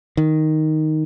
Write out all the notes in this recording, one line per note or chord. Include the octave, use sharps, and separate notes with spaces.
D#3